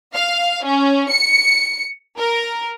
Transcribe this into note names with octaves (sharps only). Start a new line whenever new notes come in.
F5
C#4
C#7
A#4